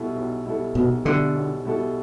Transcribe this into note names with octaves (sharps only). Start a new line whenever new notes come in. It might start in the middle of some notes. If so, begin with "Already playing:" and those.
Already playing: B1 B2 G3 E4 A4
B1
B2 G3 E4 A4
B1 B2
B2 D3 G3 E4 A4
B1
B2 G3 E4 A4